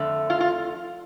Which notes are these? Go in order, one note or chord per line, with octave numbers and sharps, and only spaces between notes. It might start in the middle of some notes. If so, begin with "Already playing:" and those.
Already playing: F2 D3 A3
F4
F4